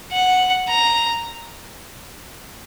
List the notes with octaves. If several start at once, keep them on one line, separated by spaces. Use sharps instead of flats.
F#5
A#5